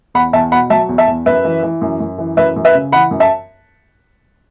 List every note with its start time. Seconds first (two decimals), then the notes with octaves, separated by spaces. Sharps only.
0.14 E2 F#5 B5
0.33 E2 E5 A5
0.52 B2 F#5 B5
0.70 F#3 E5 A5
0.89 E2
0.98 E5 A5
1.07 E2
1.26 F#2 B4 E5
1.45 E3
1.63 E3
1.81 F#2
2.00 F#2
2.18 E3
2.37 F#2 B4 E5
2.56 F#2
2.65 B4 E5
2.75 C#3
2.92 E3 F#5 B5
3.11 F#2
3.20 E5 A5